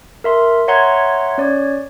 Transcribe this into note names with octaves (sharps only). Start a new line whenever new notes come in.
A#4 E5 C6
C#5 E5 F#5 A#5 C6 G#6
C#4 C#5 D5